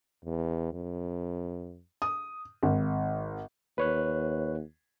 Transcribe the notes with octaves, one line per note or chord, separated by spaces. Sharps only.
E2
F2
D#6
G#1
D#2 B4 C#5 F#6